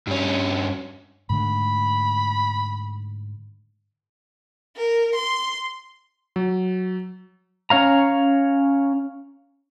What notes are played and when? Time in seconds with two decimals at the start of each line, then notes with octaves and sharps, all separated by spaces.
0.07 G2 C#4
1.30 G#2 D3 A3 B5
4.77 A#4
5.15 C6
6.36 F#3
7.70 C#4 C#5 F5 A#5